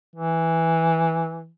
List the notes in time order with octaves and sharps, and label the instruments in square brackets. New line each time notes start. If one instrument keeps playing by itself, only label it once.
[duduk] E3